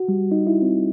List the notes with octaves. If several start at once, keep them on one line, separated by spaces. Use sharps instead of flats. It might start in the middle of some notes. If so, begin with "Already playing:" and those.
Already playing: F#4
G3
D#4
E4
C4